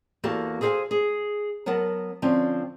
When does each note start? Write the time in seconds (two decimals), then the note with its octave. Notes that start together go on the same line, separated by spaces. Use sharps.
0.24 E2 A#3 F#4 G4 A4 A5
0.61 G#4 A4 C5 D5 F5 G#5
0.91 G#4
1.66 F#3 B3 A#4 F#5 A5
2.22 D3 F3 C4 C#4